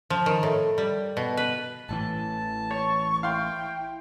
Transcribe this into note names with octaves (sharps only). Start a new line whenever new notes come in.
F3
D#3
A2
G3
B2
B4
A1 A2 E3 A5
C#5 C#6
E4 F5 G5 C6